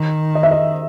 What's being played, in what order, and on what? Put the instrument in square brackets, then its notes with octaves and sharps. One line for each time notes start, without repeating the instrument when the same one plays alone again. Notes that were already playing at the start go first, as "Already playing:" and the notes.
Already playing: [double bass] D#3
[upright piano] D#5
E5
D#5